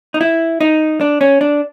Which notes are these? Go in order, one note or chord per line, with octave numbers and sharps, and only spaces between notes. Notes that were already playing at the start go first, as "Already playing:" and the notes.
D#4
E4
D#4
D4
C#4
D4